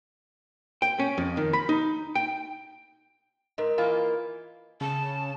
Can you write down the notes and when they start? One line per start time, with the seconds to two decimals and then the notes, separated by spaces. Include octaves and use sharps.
0.82 G5
1.00 C#4
1.18 F2
1.37 D#3
1.53 B5
1.69 D#4
2.15 G5
3.58 G#2 A#4 D#5
3.78 E3 A#3 F4
4.81 C#3 A5